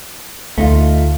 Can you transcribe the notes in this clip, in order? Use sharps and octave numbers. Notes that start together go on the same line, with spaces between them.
D2 A3 D#4 F4